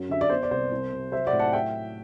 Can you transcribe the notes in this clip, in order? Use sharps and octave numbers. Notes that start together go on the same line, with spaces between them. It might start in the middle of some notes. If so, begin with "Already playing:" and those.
Already playing: F#2 F#3
D3 E5
D5
B3 C5
D5
C2 C5
C2
C3
F#3 C5 E5
D5 F#5
A2
F#5 A5
E5 G5